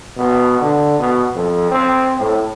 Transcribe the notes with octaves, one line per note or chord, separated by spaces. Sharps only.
B2
D3
B2
F2
C4
A2